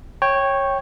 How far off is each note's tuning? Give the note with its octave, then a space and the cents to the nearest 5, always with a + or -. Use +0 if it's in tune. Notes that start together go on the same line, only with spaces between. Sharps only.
C#5 -10 G5 +0